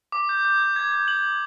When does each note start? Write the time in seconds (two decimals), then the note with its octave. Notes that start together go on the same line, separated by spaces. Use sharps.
0.12 D6
0.29 G6
0.45 G6
0.60 G6
0.76 G#6
0.92 G#6
1.08 F#7
1.24 G#6